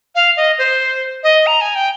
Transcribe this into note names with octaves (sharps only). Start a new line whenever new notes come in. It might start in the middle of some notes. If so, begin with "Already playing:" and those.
F5
D#5
C5
D#5
A#5
G#5
G5